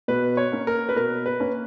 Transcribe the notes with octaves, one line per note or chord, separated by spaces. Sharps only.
B2 B4
C#5
A#3 C#4
A#4
B4
B2 A#4
B4
A#3 C#4